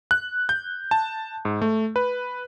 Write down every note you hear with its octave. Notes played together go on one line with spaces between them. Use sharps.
F#6
G6
A5
G#2
A3
B4